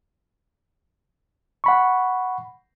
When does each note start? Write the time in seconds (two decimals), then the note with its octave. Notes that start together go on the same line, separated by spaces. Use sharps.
1.64 F#5 B5 C#6